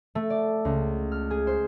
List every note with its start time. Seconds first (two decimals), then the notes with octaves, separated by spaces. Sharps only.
0.15 A3
0.30 D5
0.65 C#2
1.12 F6
1.30 G#4
1.47 C5